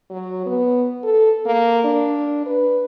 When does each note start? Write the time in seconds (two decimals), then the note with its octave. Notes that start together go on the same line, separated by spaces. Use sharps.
0.10 F#3
0.46 B3
1.03 A4
1.46 A#3
1.85 D4
2.46 B4